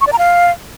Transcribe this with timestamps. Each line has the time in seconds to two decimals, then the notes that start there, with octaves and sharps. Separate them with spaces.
0.01 C#6
0.07 D5
0.13 A#5
0.18 F5